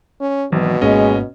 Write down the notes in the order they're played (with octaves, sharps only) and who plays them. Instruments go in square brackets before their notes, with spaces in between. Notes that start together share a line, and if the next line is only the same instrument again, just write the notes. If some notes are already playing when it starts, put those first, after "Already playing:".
[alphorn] C#4
[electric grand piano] G#1 [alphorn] B2 [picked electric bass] E3 F#3
[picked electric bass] G#1 G#2 A#3 [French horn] G#3 [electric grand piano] C#4 D#5